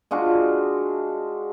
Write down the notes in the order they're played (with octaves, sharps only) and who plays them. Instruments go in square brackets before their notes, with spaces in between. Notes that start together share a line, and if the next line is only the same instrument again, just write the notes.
[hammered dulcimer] G#3 D4 F4 F#4